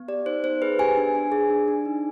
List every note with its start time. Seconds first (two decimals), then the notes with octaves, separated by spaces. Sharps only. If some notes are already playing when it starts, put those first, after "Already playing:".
Already playing: B3
0.08 G4 D5
0.26 D#4 C5
0.44 B3 C5
0.62 G#4 B4
0.79 G4 G#5
0.97 D4
1.15 D4
1.32 G#4
1.50 D4
1.68 D4
1.85 D#4